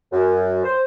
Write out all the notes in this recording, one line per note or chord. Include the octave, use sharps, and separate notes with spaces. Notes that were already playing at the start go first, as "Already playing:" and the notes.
F#2
C5